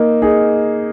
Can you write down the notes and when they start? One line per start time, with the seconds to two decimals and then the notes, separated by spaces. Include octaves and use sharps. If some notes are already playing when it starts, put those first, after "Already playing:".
Already playing: A#3 D#4
0.22 D#4 G#4